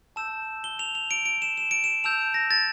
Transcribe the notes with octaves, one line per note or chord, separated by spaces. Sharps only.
A5 E6 G6 E7
G7
F7
F7
D7
D7
E7
E7
D7
E7
A5 E6 G6 F7
A#6
A6